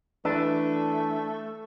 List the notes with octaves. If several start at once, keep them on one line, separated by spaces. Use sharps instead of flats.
E3 A3 D4 B4 E6